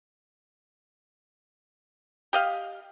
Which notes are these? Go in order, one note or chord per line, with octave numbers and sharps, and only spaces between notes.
G4 D#5 F5